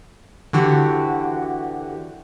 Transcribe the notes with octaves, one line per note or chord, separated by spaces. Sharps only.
D3 E3 F#4 G4